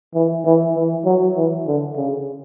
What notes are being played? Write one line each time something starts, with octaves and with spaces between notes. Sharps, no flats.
E3
E3
E3
F#3
E3
D3
C#3